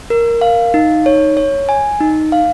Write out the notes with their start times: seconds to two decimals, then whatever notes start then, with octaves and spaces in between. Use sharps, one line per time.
0.10 A#4
0.41 F5
0.74 D#4
1.06 C#5
1.37 C#5
1.69 G#5
2.00 D#4
2.32 F5